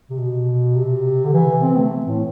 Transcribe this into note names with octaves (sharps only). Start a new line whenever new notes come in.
C3
B2
C3
D3
E3
C4
A3
A2